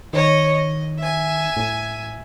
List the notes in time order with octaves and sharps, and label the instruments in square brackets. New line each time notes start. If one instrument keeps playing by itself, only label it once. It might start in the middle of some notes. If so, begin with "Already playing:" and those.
[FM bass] D#3 [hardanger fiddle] C#5 D#5
[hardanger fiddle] D#5
E5 G#5
[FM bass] A2